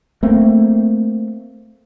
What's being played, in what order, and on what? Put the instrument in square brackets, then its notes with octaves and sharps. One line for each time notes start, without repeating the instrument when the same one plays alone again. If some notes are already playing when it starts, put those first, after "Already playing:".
[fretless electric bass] A3 A#3 C4